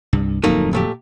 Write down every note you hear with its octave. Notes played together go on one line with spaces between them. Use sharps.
C2 G2
D1 F2 F#3 A3 A#3 D#4
A#2 A3 G4